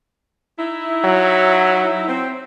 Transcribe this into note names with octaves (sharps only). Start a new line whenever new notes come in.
D#4 E4
F#3
C4